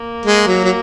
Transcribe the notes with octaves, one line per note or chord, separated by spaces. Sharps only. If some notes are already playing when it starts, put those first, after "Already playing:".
Already playing: A#3
G#3
F#3
F#3